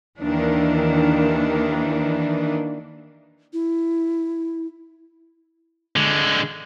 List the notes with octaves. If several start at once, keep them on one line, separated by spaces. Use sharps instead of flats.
D#2 D#3 E3 D4
E4
D3 G#3